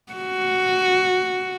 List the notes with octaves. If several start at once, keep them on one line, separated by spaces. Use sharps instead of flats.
F#4